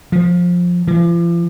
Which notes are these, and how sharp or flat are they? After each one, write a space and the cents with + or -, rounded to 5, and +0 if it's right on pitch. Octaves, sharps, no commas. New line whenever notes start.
F3 +15
F3 -45